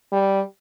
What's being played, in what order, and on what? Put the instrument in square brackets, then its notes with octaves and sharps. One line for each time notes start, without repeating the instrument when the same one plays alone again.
[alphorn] G3